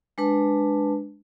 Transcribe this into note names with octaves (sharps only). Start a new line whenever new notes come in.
G#3 D4 B4 A5